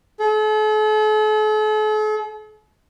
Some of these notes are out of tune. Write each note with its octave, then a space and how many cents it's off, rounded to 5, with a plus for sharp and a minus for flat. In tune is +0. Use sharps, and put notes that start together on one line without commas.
A4 -45